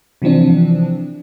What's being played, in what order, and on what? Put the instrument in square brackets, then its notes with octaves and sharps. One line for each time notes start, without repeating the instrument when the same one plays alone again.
[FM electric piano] C3 E3 F3 C4 D4